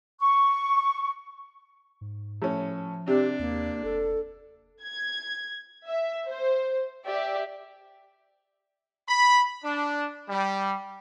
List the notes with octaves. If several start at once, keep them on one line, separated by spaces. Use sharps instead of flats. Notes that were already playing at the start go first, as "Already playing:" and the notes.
C#6
G#2
A2 F3 C#4
C3 D4 G4
D#2 A#3
F1 A4
G#6
E5
C5
G4 D5 E5
B5
D4
G3